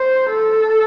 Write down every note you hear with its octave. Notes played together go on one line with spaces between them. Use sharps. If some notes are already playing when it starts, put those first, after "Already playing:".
Already playing: C5
A4